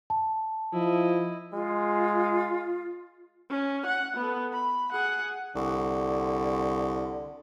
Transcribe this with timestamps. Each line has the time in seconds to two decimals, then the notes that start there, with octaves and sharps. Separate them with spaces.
0.10 A5
0.73 F3 E4 D#5
1.53 G#3 F4
3.50 C#4
3.86 F#5
4.17 B3 A4
4.53 B5
4.91 G#4 F#5
5.55 C2 D3